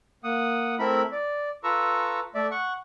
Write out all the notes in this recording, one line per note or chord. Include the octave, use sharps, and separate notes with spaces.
A#3 F#5 D#6
A3 C4 E4 A#4 E5 B5
D5
F4 A4 B4 A#5 C#6 E6
A3 D5 E5
F#5 C#6